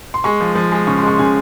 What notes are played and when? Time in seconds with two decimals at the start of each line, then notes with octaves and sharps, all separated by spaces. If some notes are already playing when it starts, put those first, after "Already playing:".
0.14 C6
0.24 G#3 C#6
0.41 F3
0.55 F3
0.72 G#3
0.87 C#3 C#6
0.98 G#3 C6
1.08 C#6
1.18 C#3 G#5